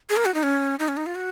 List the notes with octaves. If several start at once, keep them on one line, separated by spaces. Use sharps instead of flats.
G#4
A#4
F#4
D#4
C#4
D#4
C#4
D#4
F4
F#4